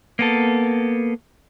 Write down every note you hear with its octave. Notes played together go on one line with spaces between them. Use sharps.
A#3 B3 A4